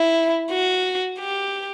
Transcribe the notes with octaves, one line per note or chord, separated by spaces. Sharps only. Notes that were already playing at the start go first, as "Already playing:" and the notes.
Already playing: E4
F#4
G4